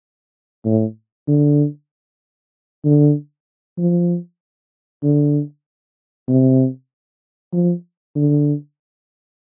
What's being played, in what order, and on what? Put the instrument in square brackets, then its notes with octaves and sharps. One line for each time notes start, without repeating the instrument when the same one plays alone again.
[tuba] A2
D3
D3
F3
D3
C3
F3
D3